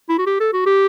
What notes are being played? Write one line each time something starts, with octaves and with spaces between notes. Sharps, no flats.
E4
F#4
G4
A4
F#4
G4